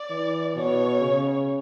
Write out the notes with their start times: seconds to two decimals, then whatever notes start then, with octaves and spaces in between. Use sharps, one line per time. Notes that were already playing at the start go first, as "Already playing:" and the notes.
Already playing: D5
0.10 E3
0.56 B2 C#5
1.01 C#3